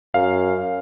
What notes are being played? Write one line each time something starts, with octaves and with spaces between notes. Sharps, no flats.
F#2 F5